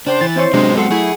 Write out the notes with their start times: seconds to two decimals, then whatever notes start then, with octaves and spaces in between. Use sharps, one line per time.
0.07 C#3 D4 C5 G5 C6
0.21 E3 A6
0.36 C4 E4 C5 C#5
0.54 C3 F#3 G#3 B3 C4 D4
0.77 G#3 A4 F#5 C6
0.91 F#3 A3 E4 G#4